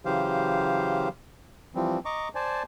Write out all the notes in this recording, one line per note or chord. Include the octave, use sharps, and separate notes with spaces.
C#3 E3 F#3 G4 C5 F5
E3 F3 G3 C4
D#5 A#5 C#6 D6
C5 D5 G#5 A5